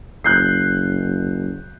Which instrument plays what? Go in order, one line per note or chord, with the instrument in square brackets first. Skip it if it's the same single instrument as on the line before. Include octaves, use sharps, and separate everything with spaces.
[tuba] F#1 [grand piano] F#6 G6 C7